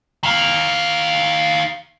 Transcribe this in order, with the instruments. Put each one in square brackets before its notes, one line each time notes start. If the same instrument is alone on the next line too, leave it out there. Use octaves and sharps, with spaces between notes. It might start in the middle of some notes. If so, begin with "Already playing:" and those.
[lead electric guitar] D#3 F5